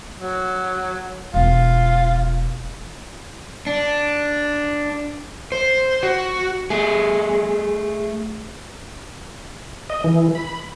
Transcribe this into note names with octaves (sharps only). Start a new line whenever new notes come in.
F#3
E1 B3 F4
D4
C5
F#4
A3 G#4
D#5
E3
B5